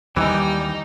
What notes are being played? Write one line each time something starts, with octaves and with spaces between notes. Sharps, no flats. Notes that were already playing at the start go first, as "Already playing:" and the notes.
D#2 D#3 E3 G3 D#4